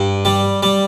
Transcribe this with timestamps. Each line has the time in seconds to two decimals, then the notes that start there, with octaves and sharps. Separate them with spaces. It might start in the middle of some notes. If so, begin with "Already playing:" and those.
Already playing: G2
0.25 G3
0.63 G3